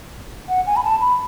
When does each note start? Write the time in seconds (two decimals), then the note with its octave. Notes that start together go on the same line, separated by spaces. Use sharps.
0.49 F#5
0.67 G#5
0.76 B5
0.84 A5
1.01 B5